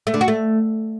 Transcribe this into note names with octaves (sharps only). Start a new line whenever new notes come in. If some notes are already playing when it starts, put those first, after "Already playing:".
A3
D3
F#4
A3